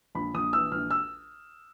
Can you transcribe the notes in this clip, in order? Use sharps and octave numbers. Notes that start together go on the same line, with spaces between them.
A#1 B5
A#1 D#6
E3 E6
A#1 F6
E6